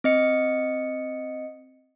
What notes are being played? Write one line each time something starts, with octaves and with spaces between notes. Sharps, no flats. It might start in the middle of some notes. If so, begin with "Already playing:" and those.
C4 D#5 C#7